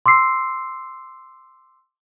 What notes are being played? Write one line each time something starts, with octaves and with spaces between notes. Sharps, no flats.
C6 D6 E6 C7